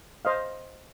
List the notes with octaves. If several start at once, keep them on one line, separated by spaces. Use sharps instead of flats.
C5 D#5 F5